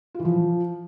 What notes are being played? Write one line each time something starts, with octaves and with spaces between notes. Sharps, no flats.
F4
E3
F3